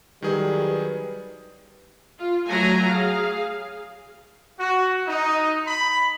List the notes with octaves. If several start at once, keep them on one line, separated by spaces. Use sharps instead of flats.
D#3 F#3 G3 G#4 B4
F4
F#3 A3 G#5 A#5
G#4 F5
F#4
D#4
B5